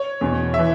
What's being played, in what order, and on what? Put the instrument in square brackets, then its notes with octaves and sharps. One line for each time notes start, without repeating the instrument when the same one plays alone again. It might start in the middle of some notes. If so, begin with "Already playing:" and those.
Already playing: [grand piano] C#5
E2 B2
E5
E3